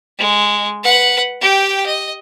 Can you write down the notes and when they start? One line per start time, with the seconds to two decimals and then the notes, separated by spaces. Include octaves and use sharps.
0.19 G#3
0.84 B4 F#5
1.42 G4 G5
1.86 D#5